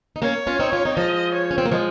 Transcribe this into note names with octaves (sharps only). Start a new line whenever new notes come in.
D#4
A#3 C#4 C#5
C#4 F4
C4 D#4
C#4 F4
C4 D#4
F3 G#3 D#5
C#5
C#4
C4
A#3
F3 G#3